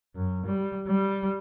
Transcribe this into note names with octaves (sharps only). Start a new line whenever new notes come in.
F#2
G3
G3